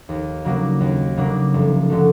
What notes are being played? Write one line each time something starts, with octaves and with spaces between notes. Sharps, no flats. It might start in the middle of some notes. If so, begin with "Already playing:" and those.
D#2
C#3 F#3 A#3 D4
D#2
C#3 F#3 A#3 D4
F1
D3 F#3 A3